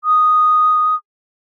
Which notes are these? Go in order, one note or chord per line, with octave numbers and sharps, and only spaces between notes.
D#6